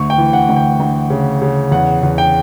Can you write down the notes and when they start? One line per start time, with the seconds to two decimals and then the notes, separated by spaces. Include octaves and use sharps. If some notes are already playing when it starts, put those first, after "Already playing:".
Already playing: D2 C#6
0.10 G5
0.18 E3
0.33 F#5
0.49 D2
0.56 G5
0.80 D2
1.10 C#3
1.42 C#3
1.71 E2 F#5
2.03 E2
2.18 G5